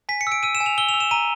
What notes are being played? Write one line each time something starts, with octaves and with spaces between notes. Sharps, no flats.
G#5 B6
C#7
E6 D7
E6 D#7
E7
G#5
F7
E6 G7
F7
E6
E7
A#5 D#7